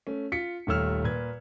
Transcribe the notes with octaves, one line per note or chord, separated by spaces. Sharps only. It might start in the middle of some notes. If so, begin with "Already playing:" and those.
A3 C#4
F4 B6 C#7
D#1 D#2 A3 C#5 E6 F6
A#2 B4 G#6